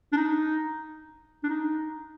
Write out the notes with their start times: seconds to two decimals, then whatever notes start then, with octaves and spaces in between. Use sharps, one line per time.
0.13 D4
0.17 D#4
1.44 D4
1.49 D#4